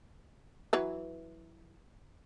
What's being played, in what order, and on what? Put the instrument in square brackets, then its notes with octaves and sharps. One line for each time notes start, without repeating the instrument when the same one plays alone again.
[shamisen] E3 F#3 B4